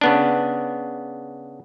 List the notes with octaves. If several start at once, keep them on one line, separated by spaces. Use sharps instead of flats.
C#3 B3 D4